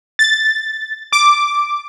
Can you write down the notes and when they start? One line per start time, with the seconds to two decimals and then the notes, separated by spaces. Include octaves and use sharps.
0.19 A6
1.13 D6